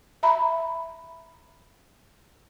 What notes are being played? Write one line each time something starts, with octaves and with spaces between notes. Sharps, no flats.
E5 A#5 B5